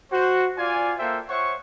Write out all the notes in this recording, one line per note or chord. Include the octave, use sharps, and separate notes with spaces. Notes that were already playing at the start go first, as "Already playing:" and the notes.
F#4 C5
F4 D5 G#5
A#3 F4 A4 C5 E5 G5
C5 C#5 E5 F#5 C#6